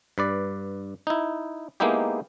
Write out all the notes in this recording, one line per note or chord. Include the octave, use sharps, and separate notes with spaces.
G2 B4 D5
D#4 E4
G#3 A#3 B3 D#4 E4 G4